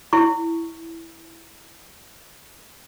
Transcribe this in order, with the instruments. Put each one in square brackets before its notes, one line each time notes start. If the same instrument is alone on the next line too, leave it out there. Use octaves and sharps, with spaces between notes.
[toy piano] E4 C#6